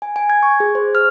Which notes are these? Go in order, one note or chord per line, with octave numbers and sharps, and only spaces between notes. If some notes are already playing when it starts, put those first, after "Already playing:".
G#5
G#5
G#6
C#6
G#4
C5
F6